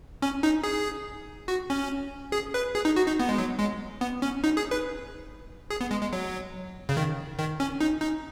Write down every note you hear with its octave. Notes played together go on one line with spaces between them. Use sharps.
C#4
D#4
G#4
F#4
C#4
G#4
B4
G#4
D#4
F#4
D#4
B3
G#3
F#3
G#3
B3
C#4
D#4
G#4
B4
G#4
B3
G#3
G#3
F#3
C#3
D#3
D#3
C#4
D#4
D#4